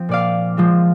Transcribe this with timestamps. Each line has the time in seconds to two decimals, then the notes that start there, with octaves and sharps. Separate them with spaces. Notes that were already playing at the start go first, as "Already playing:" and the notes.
Already playing: F3 C4
0.09 A#2 D5 F5
0.57 F3 G#3 C4